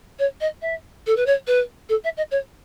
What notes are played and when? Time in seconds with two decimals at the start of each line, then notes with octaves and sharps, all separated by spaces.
0.19 C#5
0.41 D#5
0.62 E5
1.07 A4
1.16 B4
1.26 C#5
1.47 B4
1.89 A4
2.04 E5
2.17 D#5
2.31 C#5